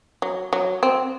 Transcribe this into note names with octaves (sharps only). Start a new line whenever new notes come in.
F#3
F#3
C4